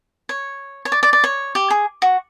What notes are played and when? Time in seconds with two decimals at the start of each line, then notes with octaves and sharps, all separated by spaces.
0.29 C#5
0.85 C#5
0.92 D5
1.03 D5
1.13 D5
1.24 C#5
1.55 G4
1.70 G#4
2.02 F#4